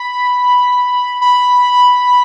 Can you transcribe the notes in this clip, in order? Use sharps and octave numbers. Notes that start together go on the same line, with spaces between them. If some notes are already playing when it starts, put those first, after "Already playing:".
Already playing: B5
B5